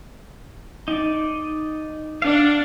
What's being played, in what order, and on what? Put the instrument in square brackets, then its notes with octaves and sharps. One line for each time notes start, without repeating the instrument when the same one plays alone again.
[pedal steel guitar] D#4 D5
[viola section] D4 [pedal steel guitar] F5 F#5